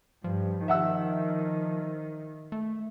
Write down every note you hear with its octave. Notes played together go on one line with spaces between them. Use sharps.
G2 F3
D#3 E5 F#5 E6
A3